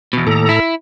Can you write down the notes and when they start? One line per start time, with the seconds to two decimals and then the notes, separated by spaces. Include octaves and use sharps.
0.13 E2 B2
0.27 D#2 A2 A4 A#5
0.49 E4